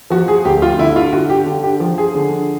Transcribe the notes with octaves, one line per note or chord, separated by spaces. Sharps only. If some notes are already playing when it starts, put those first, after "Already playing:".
F3 F#4
G#4
D2 G4
F4
D3 E4
F4
D3 F#4
G4
D3
G4
F3
G#4
D3